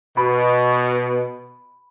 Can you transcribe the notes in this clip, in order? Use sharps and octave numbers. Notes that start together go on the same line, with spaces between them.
B2 B5